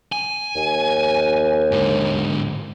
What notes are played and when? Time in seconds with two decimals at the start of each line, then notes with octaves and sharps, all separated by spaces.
0.12 G#5
0.55 D#2
1.71 G#2 D3